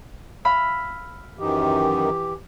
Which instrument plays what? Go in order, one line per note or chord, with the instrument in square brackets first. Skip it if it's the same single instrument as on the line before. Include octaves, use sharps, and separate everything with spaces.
[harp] F5 B5 E6
[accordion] F#2 D#3 [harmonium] E3 G4